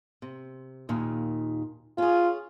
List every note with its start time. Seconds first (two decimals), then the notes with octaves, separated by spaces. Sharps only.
0.22 C3
0.89 D#2 A#2 D#3
1.98 C#4 F4 G#4